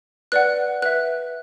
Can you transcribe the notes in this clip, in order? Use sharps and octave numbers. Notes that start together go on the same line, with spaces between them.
B4 D5 F#5 F#6
B4 E5 F#6